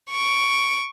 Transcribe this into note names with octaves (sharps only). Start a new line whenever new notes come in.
C#6 D7